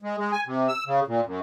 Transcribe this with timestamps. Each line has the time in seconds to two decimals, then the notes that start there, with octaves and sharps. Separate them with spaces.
0.02 G#3
0.18 G#3
0.32 G#5
0.46 C3
0.68 E6
0.86 C#3
1.07 A#2
1.25 F#2